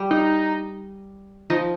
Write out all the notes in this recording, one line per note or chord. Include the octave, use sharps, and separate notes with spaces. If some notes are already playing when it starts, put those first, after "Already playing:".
Already playing: G3
D#4
F3 D#4